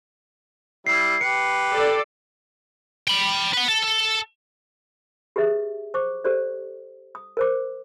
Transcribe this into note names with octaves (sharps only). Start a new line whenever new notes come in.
G3 E4 C7
G4 B4 C#7
A4 D5
G5 B5
B4 F#5
A4
A4
G4 G#4 B4 D#5 E5
C5 C#6 D6
G4 A4 C5 D5
D#6
A#4 C5 D6